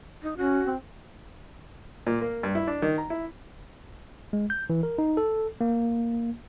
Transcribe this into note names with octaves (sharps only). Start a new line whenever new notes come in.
D#4
C#4 F#4
C4
A#2
A#3
G2
E4
D4
D#3
A#5
E4
G#3
G6
E3
A#4
D#4
A4
A#3